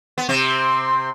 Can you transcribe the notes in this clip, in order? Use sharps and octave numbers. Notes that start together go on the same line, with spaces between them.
B3
C3 C4